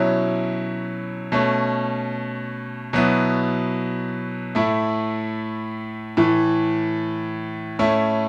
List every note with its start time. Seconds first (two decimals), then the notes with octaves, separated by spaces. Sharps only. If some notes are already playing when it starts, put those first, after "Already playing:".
Already playing: B2 F#3 C#4 E4
1.32 B2 A3 C#4
2.93 B2 F#3 B3 E4
4.55 A2 A3 E4
6.17 A2 E3 A3
7.79 A2 A3 C#4 E4